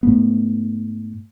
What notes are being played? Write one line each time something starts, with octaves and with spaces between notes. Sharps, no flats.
G#2 A3 B3